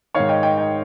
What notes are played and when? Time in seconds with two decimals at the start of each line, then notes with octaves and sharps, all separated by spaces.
0.15 G#2 D#3 C#5 F5
0.29 D#5 G5
0.43 D#5 G5
0.57 D#5 G5